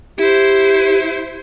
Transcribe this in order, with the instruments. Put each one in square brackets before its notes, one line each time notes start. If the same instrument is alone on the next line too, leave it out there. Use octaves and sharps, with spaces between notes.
[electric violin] E4 C5 [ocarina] G4